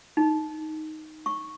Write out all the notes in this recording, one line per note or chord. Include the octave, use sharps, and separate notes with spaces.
D#4
C#6